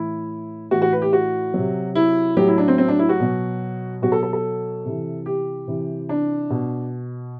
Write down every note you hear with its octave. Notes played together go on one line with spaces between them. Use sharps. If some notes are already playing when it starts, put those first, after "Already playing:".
Already playing: A2 E3 E4
A2 E3 F#4
F#4
B4
G4
F#4
C3 F#3
E4
A2 F#3 G4
E4
D4
C4
C4
D4
E4
F#4
B2 F#3
B2 F#3 F#4
A4
A4
A4
C3 E3
G4
C3 E3
D4
B2